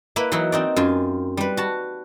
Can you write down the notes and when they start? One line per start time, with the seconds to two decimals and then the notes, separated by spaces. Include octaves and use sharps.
0.16 A#3 E4 B4
0.32 E3 F#3 D#4 E4 F#4
0.52 C4 D#4 D5
0.76 F#2 F4 G#5
1.37 G3 B4
1.57 F#4 A5